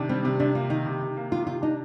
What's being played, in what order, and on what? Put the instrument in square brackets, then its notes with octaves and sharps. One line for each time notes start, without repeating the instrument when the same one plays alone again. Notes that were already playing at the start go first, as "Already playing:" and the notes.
Already playing: [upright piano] C3 D#3 D4
[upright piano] G3 [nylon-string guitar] C4
[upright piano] C3 [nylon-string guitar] C4
[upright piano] C3 [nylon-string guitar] D4
[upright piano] A#3 [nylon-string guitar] F4
[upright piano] D#3 [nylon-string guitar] D#4
[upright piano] C3
C3
A#3
[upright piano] D#3 [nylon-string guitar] F4
[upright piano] C3 [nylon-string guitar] F4
[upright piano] D4 [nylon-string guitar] D#4